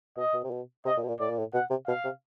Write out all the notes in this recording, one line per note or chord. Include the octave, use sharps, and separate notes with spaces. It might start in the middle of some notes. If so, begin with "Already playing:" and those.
B2 D#5
B2
C3
B2
C3 D#5
A#2
B2
A#2
A2 D5
A#2
A2
B2 F#5
C3
B2 F5
C3